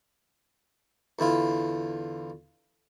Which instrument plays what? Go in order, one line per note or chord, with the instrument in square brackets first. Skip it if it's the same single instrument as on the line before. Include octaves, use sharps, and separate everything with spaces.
[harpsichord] E2 D3 E4 F4